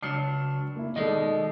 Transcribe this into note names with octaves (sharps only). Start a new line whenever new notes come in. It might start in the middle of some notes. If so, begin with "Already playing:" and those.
C#2 F#3 D4 F6 C7 C#7
A#3 E4
B2 D#3 G#3 A4 D5 D#5